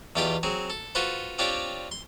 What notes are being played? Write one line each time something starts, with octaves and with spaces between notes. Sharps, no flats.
E2 B2 F4 G4 D5 C6
F#3 C4 G#4
A4
F4 F#4 A4 B4 C5
C4 D4 F4 G4 C#5 D5
C6